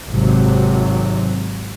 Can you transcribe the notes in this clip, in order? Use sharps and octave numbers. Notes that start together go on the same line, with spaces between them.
G#1 C3 F#3